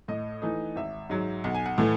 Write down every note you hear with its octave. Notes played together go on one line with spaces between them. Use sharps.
A2 D#5
E3 A3 D#4
G#1 E5
G#2 F#3
B1 F#5
G#5
F#5
A2 E3 A3